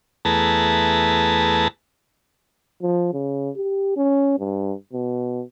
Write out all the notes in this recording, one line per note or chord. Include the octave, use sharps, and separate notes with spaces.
E2 A3 G#4 B4 A5 A#5
F3
C#3
G4
C#4
G2
B2